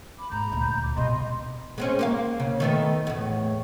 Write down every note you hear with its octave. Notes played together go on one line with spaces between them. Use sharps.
B5 D6
G#2 A#5 B5 G6
D2 A#2
D6
G2 B2 D#5 B5 C6
G#3 C4 C#4
A#3 G4 F5
C#3
D#3 A3 B3
E2 A2